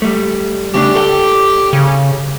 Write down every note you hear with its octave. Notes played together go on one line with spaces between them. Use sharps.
G3 A3
C#3 A3 D4 G4
A4 D5 G5
C#3